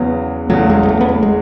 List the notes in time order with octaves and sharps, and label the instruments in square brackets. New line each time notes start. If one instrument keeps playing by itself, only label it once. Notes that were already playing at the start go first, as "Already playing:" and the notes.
Already playing: [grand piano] E2 C#3 F#3 [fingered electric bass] B3
[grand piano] E2 C#3 F#3 [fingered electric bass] A3
[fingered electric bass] G#3
G#3
A3
B3
A3
G#3